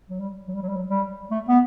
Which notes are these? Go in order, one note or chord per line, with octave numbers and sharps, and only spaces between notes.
F#3
G3
F#3
G3
F#3
G3
F#3
G3
A3
B3